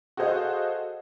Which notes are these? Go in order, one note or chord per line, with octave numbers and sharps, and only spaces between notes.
F#4 G#4 A4 C5 D#5 F5